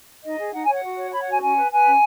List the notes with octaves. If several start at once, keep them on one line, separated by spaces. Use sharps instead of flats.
D#4 D#5
G#4
D#4 F#5
C#5 G#5
F#5
F#4
C#5
C#5 B5
F#5
F#4 G#5
C#4 G#5
B4
B4 G#5
C#4